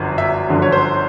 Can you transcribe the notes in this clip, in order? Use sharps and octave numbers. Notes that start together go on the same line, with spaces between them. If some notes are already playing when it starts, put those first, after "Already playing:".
Already playing: G1 F#2 D3 F3
E5
G1 F#2 D3 F3
C#5
C5